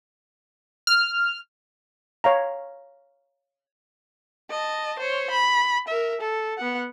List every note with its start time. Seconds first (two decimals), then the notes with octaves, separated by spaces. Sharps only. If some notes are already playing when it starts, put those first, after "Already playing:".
0.87 F6
2.24 C#5 F5 A#5
4.50 D#5 A5
4.99 C5 C#5
5.31 B5
5.88 A#4 E5
6.21 A4
6.58 B3 F#5